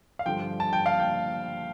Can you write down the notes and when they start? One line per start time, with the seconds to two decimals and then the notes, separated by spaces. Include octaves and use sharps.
0.19 F5
0.26 G2 D3 F3 G5
0.60 A5
0.73 G5
0.86 F5
0.99 G5